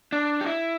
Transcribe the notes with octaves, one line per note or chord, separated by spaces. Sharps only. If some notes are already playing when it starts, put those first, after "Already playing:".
D4
G4
E4